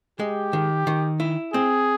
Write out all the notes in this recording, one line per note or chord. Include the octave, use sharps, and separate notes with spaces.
G#3 G4
D#3
D#3
E4
C4 G#4